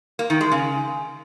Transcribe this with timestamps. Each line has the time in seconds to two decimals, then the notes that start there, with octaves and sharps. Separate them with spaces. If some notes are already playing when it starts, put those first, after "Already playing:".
0.19 A#3
0.30 D#3
0.41 G#3
0.52 C#3